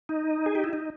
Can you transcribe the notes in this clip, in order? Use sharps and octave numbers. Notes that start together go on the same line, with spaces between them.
D#4
G#4
G4
E4
D#4